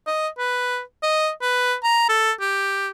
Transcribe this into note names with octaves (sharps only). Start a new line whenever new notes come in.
D#5
B4
D#5
B4
A#5
A4
G4